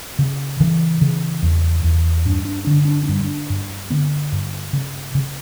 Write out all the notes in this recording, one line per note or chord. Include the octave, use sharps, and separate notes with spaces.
C#3
C#3 E3
C#3
E2
E2
G2 D4
D4
D3 D4
D4
D4
G2
D4
G2
D3 B3
G2
C#3
C#3